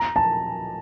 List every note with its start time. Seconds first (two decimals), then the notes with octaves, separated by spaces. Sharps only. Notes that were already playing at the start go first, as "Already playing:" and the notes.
Already playing: A#5
0.16 A5